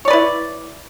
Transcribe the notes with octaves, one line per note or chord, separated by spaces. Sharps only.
E4 B4 C#5 D5